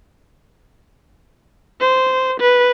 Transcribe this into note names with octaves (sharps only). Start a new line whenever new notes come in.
C5
B4